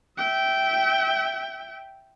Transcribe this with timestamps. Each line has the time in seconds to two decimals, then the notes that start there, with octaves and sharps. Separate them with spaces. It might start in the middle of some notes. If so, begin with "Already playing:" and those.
0.18 E5 G5